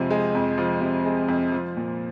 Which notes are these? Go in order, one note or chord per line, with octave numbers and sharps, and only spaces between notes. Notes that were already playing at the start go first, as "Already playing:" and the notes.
Already playing: F2 C3 F3 G#3
G#3
F2
F3
C3
G#3
F2
F3
A#2